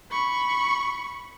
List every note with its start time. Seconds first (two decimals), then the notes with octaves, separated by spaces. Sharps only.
0.11 B5 C#6